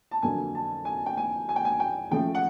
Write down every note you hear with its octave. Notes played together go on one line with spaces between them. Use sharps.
A5
F2 D3 F#3 A#3 G#5
A5
G#5
G5
G#5
G#5
G5
G#5
G5
C#3 F3 A3 G5
F#5